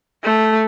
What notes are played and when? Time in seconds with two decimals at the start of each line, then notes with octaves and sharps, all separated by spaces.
0.23 A3